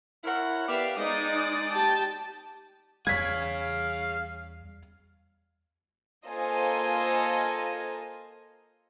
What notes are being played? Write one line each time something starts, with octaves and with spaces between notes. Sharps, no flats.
E4 A#4 C#5 F#5
B3 G4 D5 E5 F5
G#3 D#4 D5 D#6
G4 G5 A5
E2 G3 G#4 C#5 F5 G#6 B6
A#3 F4 A4 C5 D#5 G#5